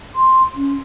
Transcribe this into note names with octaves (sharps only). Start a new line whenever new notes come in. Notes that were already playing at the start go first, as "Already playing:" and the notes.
C6
C#4